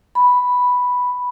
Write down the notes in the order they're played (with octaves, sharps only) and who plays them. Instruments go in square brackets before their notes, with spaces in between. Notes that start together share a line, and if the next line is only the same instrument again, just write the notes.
[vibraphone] B5